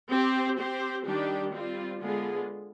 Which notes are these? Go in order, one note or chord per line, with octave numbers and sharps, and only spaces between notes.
C4 G4 C5
C4 G4 C5
D#3 G3 D4 G4
G3 C4 F4
D3 G#3 B3 F4 G#4